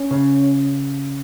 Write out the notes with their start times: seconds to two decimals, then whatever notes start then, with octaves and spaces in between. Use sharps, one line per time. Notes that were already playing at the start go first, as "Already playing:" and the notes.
Already playing: C#4
0.11 C#3